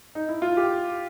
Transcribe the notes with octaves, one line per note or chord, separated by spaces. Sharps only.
D#4
E4
F4
G4